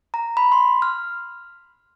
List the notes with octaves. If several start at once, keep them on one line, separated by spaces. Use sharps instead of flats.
A#5
B5
C6
F6